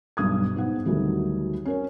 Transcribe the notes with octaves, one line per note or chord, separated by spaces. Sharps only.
B1 G2 D#6 G#6
G#2 B3 F#5
D2 D#3 F#3 G3 A3
C#4 A#4 C#5